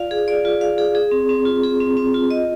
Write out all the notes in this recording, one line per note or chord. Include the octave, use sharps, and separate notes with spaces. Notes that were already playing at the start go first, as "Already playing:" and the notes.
Already playing: F4 D5 F5
G#4
D5
F4
F5
G#4
G#4
C4
C4
F4
G#4
C4
C4
F4
D#5